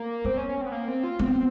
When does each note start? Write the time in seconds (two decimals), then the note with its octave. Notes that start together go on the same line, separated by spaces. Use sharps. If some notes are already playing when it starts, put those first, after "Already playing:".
Already playing: A#3
0.25 B3 C4
0.37 C#4
0.49 C#4
0.61 C4
0.66 B3
0.72 A#3
0.88 C4
1.04 F4
1.19 B3 C4